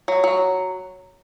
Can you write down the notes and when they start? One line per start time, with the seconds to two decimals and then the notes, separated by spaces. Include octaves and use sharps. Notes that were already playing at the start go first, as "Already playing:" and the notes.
0.08 F#3
0.24 F#3